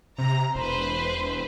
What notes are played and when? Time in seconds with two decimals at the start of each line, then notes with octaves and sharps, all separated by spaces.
0.18 C3 A#5
0.55 E1 B4 C5